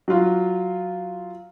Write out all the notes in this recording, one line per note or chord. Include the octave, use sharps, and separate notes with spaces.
F#3 F4